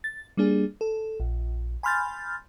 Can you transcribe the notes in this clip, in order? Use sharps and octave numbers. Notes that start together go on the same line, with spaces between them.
A6
G3 A#3 D4 G#4
A4
A#1
G#5 B5 C6 F6 G6 A6